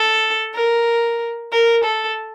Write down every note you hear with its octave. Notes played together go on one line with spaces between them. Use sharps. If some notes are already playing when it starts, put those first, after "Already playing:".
Already playing: A4
A#4
A#4
A4